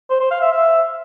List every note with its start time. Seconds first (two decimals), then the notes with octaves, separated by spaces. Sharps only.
0.10 C5
0.20 C5
0.31 F5
0.41 E5
0.52 E5